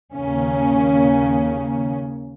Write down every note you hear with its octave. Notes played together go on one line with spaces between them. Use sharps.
D#2 C#3 A#3 C#4